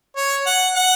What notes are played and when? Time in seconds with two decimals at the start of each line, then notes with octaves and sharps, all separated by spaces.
0.16 C#5
0.46 F#5
0.76 F#5